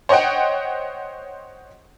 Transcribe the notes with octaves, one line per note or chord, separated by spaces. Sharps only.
C5 C#5 D#5 F#5 G5